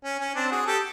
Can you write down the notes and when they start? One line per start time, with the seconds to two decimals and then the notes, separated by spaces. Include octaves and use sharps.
0.04 C#4
0.20 C#4
0.35 C4 D4
0.51 F#4 G#4
0.66 G4 A4